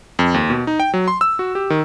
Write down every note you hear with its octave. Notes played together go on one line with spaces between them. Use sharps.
F2
D#2
B2
D#4
G5
F#3
C6
E6
F#4
G4
D#3